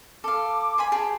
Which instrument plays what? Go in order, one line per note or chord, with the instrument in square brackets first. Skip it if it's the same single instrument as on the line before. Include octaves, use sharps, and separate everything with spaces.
[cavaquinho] A4 F5 [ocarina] D6
[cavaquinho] C5 G#5 B5
[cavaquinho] G4 G#4 [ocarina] A5